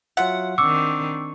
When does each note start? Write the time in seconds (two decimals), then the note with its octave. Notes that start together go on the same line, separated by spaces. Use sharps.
0.17 F#3 F4 E5 F#5
0.58 D#3 C4 D4 C#6 D6 E6